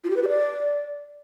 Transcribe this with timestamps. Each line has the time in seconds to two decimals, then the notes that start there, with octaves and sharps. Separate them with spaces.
0.04 F4
0.10 G4
0.16 B4
0.22 G4
0.28 D5